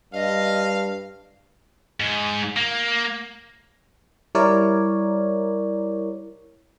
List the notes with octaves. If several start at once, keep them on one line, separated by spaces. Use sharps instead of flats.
G2 D#5 F5
G#2
A#3
G3 E4 A#4 C#5 D5